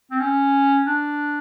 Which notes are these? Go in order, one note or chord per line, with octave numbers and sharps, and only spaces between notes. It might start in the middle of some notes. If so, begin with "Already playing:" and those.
C4
C#4
D4